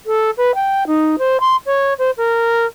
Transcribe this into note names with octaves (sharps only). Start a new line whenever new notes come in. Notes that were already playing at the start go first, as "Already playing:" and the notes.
A4
B4
G5
D#4
C5
C6
C#5
C5
A#4